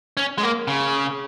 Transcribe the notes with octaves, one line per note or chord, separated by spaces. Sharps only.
C#4
G#3
A#3
C#3